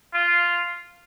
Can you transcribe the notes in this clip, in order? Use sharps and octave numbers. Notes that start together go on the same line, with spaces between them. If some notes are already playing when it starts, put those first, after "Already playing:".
F4